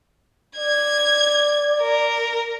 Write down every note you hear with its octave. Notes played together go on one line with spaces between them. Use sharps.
D5 G#6
A#4